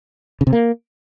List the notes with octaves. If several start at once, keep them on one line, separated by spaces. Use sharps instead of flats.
C#3
C3
A#3